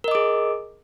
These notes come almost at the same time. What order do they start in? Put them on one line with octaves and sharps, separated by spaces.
A#4 D#5 D6 G#4